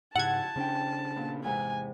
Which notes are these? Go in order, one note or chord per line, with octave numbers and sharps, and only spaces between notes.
G#2 C#3 E4 G4 E5 F#5 A5 G#6
C#3 C#4 D4 C5 G5
A#2 B3
E2 G#2 C3 G#5